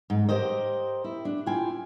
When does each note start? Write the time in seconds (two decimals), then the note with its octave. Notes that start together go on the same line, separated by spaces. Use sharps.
0.10 G#2
0.29 G4 A#4 C5 D#5
1.04 E4
1.25 D4
1.46 E4 F4 G5 G#5